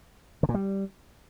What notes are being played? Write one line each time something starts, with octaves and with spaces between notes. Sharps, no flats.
D3
A#2
G3